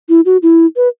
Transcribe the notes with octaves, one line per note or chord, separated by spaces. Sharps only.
E4
F#4
E4
B4